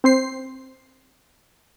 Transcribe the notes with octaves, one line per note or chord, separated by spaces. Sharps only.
C4 C5 C7